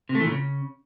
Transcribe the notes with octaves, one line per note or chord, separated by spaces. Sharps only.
C3
A3
E3
A#2
C#3